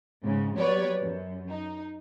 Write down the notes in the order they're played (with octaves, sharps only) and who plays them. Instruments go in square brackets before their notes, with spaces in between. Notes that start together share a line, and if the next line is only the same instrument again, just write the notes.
[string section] G#2 C#3 G#3
F#3 B3 G4 B4 C#5 D5
F#2
D#4